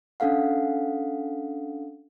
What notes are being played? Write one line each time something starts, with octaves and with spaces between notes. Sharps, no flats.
C#4 D4 A4 F5 F#5